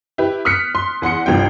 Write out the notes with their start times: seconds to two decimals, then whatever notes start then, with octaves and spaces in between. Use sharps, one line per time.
0.18 E4 G4 B4
0.45 D#6 F6 F#6 B6 C#7
0.75 C6
1.02 E2 F#5 C6 C#7
1.26 G1 C2 F4 G5